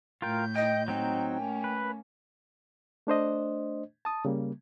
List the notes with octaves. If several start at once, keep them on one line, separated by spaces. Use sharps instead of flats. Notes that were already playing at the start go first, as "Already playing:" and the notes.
A2 F4 A#4 G5 G6
D#5 G5
F#3 C4 D#4 G5
A3 A#3 C#4
B4
A3 D4 C5 D#5
A5 D#6
C#3 G3 A#3